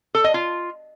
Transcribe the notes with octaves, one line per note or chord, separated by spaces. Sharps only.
A4
D#5
F4